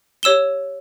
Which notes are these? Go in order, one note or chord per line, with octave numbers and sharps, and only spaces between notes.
G4 C#5 E6 E7 G7